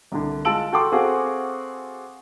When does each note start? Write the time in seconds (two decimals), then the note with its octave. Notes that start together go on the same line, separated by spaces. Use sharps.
0.12 C2 D3
0.45 G#3 F4 A5 E6 D7 F#7
0.72 F#4 A4 G5 C6 D6
0.92 C4 F#4 G#4 A4 F5 F#5